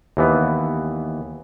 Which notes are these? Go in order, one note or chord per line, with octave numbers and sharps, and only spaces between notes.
D#2 E3 B3